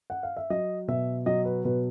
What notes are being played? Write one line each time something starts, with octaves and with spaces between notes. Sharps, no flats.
F#5
F5
E5
F#3 D#5
B2 E5
F#3 D#5
B4
B2 B4